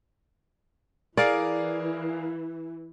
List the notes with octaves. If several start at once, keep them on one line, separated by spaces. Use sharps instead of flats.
E3 G#4 A#4 D5 F5